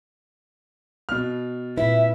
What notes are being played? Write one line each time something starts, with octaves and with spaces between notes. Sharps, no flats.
B2 F6
A#2 C4 E4 B4 E5